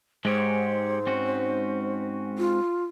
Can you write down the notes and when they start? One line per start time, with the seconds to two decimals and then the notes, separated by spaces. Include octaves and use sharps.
0.25 G#2 G#3 G4 C5 C#5
1.07 C4 C#4 F#4
2.38 F4